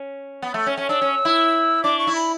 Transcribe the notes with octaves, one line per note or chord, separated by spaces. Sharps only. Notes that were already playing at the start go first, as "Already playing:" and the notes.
Already playing: C#4
B3
A3
C#4
C#4
D4 E6
C#4
E4
D4 D6
C#6
E4
B5